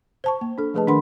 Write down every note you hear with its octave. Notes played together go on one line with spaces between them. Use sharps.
C5 A5 C#6
A#3
D4 A4
F3 A3 G#4 B4 D#5 A5
D#3 D4 A#4 F#5 B5 C6